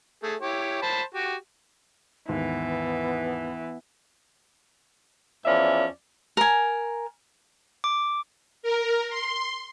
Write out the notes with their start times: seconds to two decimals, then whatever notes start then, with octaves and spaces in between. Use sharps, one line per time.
0.23 A3 G#4
0.41 E4 G4 C#5
0.82 C5 A5 B5
1.15 F#4 G4
2.28 D#2 G#2 E3 B3
5.45 E2 F3 C#4 D5 E5
6.37 A#4 G#5
7.84 D6
8.63 A#4
9.10 C6